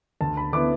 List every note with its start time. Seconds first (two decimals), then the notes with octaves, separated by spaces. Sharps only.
0.21 D2 A5
0.37 B5
0.52 D3 B3 E4 D6